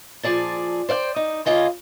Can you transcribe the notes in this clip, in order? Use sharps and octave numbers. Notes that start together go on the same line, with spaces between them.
A#2 F3 G#4 D5 A5
C5 D5 F5 G5
D#4
C#3 A#3 F4 D#5 G#5